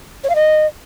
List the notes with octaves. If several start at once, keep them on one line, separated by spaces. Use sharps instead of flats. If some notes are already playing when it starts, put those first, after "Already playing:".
C#5
F5
D#5